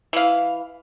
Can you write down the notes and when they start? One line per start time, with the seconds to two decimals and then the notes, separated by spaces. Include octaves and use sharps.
0.13 E3 F5